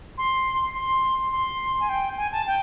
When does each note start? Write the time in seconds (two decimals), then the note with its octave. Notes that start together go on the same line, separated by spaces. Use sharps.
0.18 C6
0.75 C6
1.32 C6
1.80 G#5
1.89 G5
2.17 G#5
2.32 A5
2.47 G5